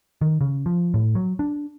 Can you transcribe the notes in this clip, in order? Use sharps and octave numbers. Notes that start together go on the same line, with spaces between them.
D#3
C#3
F3
A2
F#3
D4